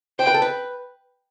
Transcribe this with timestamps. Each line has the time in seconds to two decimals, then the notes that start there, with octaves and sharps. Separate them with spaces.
0.19 C5 G5
0.27 B4
0.34 A4
0.42 B4